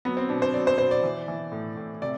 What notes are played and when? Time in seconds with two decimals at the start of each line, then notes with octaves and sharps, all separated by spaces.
0.05 F#3 B3
0.17 C4
0.29 B2 D4
0.42 C5
0.54 F#3 D5
0.67 C5
0.78 B2 C5
0.91 D5
1.04 E3
1.28 E3
1.52 A2
1.77 A2
2.02 C3 D5